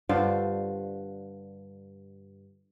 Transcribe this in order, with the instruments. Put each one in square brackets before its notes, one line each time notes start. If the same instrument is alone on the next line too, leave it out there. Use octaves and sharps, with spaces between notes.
[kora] G2 D3 F4 C5